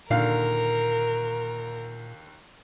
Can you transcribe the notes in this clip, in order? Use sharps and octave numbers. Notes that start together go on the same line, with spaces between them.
D#2 A#2 D3 A#4 F5